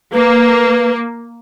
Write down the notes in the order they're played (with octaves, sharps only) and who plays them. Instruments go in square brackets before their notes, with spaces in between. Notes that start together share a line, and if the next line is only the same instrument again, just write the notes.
[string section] A#3 [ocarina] B4